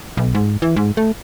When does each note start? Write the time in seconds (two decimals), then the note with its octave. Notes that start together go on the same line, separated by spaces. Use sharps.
0.17 B1
0.35 G#2
0.62 E3
0.76 G#2
0.97 A3